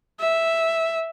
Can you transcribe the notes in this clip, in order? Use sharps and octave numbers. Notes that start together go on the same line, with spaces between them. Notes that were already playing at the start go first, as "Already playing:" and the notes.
E5